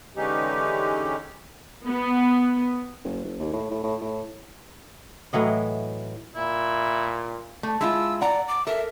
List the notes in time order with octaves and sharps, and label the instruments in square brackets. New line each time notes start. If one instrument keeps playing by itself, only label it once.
[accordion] D3 E3 G#3 C#4 D#4 G4
[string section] B3
[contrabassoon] F#1
F#1
D#2
A2
A2
A2
A2
[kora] A2 E3 F#3 D#5
[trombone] A#2 [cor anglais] E4
[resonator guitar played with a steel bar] A3
[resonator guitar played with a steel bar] G#3 E4 F4 [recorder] E6
[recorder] D5 [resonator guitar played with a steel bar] F#5 A#5
[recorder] D6
[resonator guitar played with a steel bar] A4 A#4 [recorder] E5